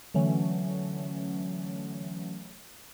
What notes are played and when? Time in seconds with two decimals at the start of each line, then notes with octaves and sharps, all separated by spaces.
0.14 D3 E3 F#3 A3 C#4